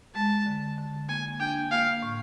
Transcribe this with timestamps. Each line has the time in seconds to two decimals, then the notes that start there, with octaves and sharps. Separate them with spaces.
0.15 G#3 A5
0.46 D3
0.78 D3
1.09 A#3 G#5
1.40 D4 G5
1.71 A#3 F5
2.03 A2